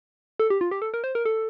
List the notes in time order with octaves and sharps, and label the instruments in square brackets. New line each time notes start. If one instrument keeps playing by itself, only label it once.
[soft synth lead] A4
G4
F4
G4
A4
A#4
C5
A#4
A4